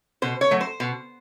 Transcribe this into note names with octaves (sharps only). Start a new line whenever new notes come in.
B2 C5
C#5
F#3 A3
C5
B2